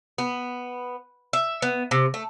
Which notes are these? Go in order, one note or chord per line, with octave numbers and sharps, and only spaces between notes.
B3
E5
B3
C3
A3